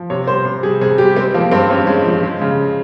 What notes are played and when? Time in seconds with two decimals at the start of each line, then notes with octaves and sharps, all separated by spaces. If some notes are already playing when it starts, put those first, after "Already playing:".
Already playing: F3
0.10 C3 C#5
0.27 G3 C5
0.45 C3
0.63 G3 G#4
0.81 C3 G#4
0.98 G3 G4
1.16 G#3 C4
1.34 F3 A#3
1.51 G2 C4
1.70 G2 C#4
1.87 G#3
2.05 F3
2.23 G#3
2.41 C#3